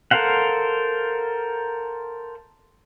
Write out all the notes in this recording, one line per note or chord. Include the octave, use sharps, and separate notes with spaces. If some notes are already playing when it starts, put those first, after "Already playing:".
A4 A#4 C5 F5 F#5